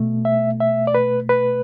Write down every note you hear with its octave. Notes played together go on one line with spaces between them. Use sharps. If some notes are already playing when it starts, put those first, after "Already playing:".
Already playing: B2 A3
E5
E5
D5
B4
B4